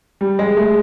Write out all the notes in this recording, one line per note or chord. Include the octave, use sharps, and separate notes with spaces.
G3
G#3
A3